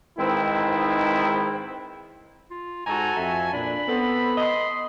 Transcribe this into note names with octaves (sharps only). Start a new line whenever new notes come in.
G#2 D#3 G#3 C4 E4 B4
F4
G#2 F#4 A4 G#5 A#5
F2 E5
A#2 D4 B5
B3 C4 A4
D#5 C6